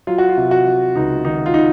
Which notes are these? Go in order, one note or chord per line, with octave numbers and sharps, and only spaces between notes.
F#3 F4
F#4
F4
C3
F#4
F#3
C#2 D#4
D#3 D#4
F4
D#4